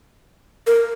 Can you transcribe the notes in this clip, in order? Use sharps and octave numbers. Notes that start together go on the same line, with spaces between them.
A#4